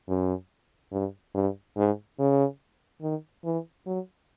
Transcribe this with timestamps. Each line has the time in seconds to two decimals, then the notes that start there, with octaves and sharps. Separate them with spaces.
0.08 F#2
0.92 G2
1.35 G2
1.77 G#2
2.19 C#3
3.02 D#3
3.45 E3
3.86 F#3